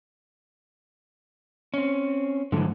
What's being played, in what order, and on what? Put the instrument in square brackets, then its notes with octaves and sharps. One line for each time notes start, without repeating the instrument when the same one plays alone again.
[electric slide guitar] C4 C#4
[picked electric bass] G#2 F#3 A3 [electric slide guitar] D3 E3